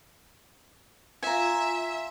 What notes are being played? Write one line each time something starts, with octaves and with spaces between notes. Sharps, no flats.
F4 E5 G#5 A#5